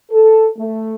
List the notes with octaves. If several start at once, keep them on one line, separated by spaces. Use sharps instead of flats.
A4
A3